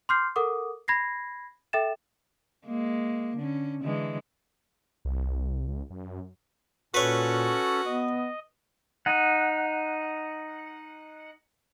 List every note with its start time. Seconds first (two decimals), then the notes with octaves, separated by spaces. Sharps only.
0.09 C6 D6 F6 G6 C7
0.36 A4 A#4 F#5 D6 D#6
0.88 B5 G#6 A#6 C7
1.73 A4 E5 G5 A6 E7
2.65 G#3 A#3
3.37 D3 C#4
3.82 D3 E3 G#3
5.05 C2
5.68 C#2
5.90 F#2
6.94 A#2 C#4 F#4 A4 B4 C#5
7.85 B3 D#5
9.06 D#4 F#5